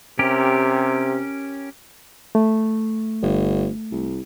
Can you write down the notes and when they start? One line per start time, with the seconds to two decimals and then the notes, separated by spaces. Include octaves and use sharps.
0.19 C3 C#4 G4 A#4
2.35 A3
3.22 G1
3.91 C2